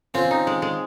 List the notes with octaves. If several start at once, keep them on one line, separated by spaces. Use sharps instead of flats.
C4 C#4 F4
D#4
G#3
G#3